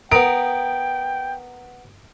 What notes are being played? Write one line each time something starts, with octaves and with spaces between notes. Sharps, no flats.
B3 A#4 G5 D#6 D7